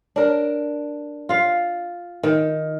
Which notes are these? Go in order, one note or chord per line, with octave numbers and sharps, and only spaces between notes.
D4 A#4
F4 F5
D#3